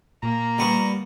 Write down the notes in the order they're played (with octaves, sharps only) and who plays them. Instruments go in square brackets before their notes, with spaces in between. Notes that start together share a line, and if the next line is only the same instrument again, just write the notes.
[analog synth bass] A#2 [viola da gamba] A#3 [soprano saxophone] A#5
[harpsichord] G3 B3 C#6